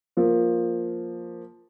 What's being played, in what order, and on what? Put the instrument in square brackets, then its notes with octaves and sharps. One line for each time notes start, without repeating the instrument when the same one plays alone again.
[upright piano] F3 A#3